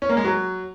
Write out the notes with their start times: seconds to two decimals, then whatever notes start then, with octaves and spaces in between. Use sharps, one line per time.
0.02 C#4
0.09 A#3
0.17 G#3
0.25 F#3